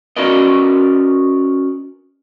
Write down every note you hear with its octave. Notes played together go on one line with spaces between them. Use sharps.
C#4 F#4 A#4 B4 D5 D#5